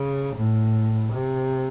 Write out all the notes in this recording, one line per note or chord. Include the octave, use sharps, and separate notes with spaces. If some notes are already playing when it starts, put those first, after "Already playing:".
Already playing: C#3
A2
C3